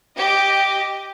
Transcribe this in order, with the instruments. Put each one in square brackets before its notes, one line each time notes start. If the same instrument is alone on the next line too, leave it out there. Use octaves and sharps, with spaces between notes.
[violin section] G4 D#5